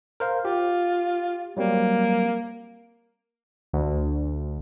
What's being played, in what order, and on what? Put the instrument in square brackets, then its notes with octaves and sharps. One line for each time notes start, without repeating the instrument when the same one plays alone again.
[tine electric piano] A#4 C5 F5
[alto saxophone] F4 [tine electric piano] G4
[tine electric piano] F#3 G3 C4 [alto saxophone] A#3
[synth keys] D2